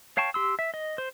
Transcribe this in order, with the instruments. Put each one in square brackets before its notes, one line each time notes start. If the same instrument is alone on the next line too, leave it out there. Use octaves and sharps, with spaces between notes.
[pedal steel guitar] C#5 F5 G5 A5 C#6
G4 C6 E6
E5
D#5
C5